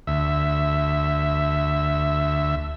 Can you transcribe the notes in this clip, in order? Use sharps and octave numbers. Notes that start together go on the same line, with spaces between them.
D2 E5